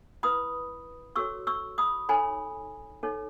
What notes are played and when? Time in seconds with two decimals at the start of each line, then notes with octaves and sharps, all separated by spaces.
0.23 E4 B4 B5 D#6
1.16 F#4 A4 C#5 C#6 E6
1.47 C#6 E6
1.78 B5 D#6
2.09 D#4 A4 C#5 G#5 B5
3.03 D#4 A4 C#5